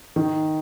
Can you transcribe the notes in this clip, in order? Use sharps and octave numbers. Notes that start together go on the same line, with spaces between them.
D#3